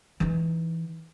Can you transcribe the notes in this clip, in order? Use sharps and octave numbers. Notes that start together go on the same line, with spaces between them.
E3 D#4